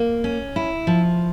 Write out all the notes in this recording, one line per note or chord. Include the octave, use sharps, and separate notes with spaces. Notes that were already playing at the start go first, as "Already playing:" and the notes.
Already playing: A#3
C#4
E4
F3